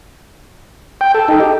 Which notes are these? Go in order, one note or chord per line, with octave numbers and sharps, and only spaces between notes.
G5
A4
D#4
G4